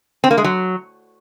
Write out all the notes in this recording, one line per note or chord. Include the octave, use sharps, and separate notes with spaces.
C4
A#3
G#3
F#3